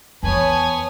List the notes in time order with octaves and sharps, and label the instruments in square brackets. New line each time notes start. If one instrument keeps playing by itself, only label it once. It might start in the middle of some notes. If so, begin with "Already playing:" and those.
[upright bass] E2 [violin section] B4 C#5 D#6 [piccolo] G#5 [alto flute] A5